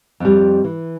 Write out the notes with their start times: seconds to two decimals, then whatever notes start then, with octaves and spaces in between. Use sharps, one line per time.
0.20 F2 G3
0.64 E3